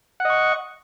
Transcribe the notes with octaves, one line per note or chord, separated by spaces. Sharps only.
D#5 F#5 C#6